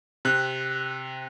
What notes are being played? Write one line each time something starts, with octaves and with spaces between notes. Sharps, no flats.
C3 F#6